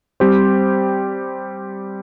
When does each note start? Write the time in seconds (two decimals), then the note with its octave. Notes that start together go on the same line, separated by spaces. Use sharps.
0.20 G3 C4 G4 C5